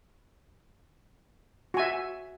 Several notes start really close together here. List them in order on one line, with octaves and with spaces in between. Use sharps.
F#4 G#5 E5